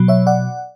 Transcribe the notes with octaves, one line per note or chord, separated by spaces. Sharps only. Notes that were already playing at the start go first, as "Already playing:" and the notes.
Already playing: B2 F#3
C#5 E5
D5 F#5